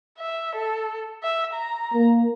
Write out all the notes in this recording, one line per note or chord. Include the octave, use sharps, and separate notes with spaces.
E5
A4
E5
A#5
A#3